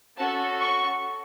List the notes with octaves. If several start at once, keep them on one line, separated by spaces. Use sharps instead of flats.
C#4 F#4 A4 A5
C#6